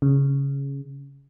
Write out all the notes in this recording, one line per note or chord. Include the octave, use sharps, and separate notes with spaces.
C#3